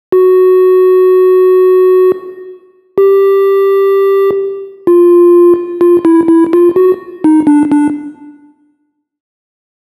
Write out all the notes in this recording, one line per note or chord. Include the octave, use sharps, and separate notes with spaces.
F#4
G4
F4
F4
E4
E4
F4
F#4
D#4
D4
D4